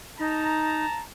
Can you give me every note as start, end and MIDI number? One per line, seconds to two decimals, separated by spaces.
0.19 0.86 63
0.19 1.02 81
0.19 1.02 82